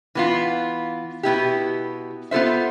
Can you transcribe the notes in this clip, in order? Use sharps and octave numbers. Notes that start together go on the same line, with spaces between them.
E3 B3 F4
B2 B3 E4 G4
B3 F4 A4 C5 E5